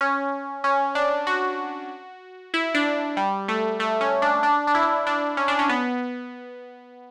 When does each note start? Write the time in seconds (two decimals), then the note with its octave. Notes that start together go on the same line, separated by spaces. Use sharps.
0.01 C#4
0.64 C#4
0.95 D4
1.27 F#4
2.54 E4
2.74 D4
3.17 G3
3.48 A3
3.80 A3
4.01 C#4
4.22 D4
4.43 D4
4.67 D4
4.75 E4
5.07 D4
5.37 C#4
5.48 D4
5.59 C#4
5.69 B3